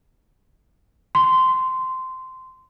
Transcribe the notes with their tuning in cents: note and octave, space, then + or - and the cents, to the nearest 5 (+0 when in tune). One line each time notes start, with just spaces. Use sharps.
C6 -15